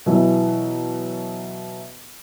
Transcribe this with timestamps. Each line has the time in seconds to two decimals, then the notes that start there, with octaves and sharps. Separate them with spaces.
0.06 B2 E3 F#3